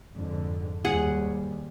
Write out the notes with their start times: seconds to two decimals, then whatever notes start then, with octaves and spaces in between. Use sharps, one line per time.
0.15 F2 G#2 D3
0.85 D#2 G#2 G3 G#4 F#5